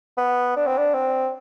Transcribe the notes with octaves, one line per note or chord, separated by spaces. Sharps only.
B3
D4
C4
D4
C4